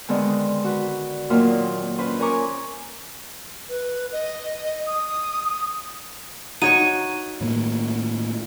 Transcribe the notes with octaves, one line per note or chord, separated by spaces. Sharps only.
D3 D#3 G#3 B3 C4
F#4 B4
A#2 D#3 F#3 A#3 C4 F4
C#4 F4 B4 C5
C#4 A#4 G#5 A#5 C#6 D6
B4
D#5
D#6
D#4 F#4 C#5 C#6 D#7
A2 D#3 A#3